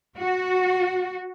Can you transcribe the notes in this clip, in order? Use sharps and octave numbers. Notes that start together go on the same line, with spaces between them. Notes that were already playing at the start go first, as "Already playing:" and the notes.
F#4